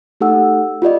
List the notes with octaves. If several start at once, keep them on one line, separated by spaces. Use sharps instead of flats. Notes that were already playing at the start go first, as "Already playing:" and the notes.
A3 D#4 G4 A4 F#5 E6
F4 G4 D5 D#5